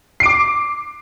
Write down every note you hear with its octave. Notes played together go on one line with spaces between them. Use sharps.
D6 C7 D7